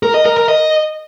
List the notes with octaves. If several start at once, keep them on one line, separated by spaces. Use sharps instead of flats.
A#4
D#5
A#4
A#4
D#5